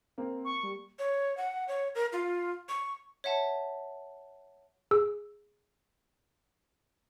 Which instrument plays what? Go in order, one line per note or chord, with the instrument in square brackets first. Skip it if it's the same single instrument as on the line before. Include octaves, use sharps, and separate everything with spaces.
[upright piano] A#3 [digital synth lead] C4
[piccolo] C#6
[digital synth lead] G3
[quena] C#5
F#5
C#5
A#4
F4
C#6
[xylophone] C#5 E5 F#5 A5
[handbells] G#4 E6